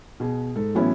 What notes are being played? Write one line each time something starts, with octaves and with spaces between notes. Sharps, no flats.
B2 G#4
G#2 A4
A1 F#3 B3 C#4 E4